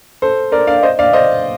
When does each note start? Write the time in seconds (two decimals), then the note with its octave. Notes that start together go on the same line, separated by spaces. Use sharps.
0.22 A4 C5
0.52 A#4 D5
0.67 D5 F5
0.83 C5 D#5
0.99 D5 F5
1.13 C5 D#5